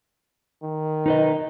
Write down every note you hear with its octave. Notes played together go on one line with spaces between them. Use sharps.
D#3
D#4 B4 D#5